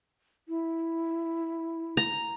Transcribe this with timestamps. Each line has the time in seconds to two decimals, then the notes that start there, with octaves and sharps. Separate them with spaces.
0.48 E4
1.97 A#5